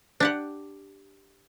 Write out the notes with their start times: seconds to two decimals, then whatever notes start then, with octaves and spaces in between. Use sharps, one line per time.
0.20 D4 G4 F#5